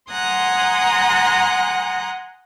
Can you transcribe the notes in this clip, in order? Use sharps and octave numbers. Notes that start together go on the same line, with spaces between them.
F#5 G#5 A#5 C6 D#6 F#6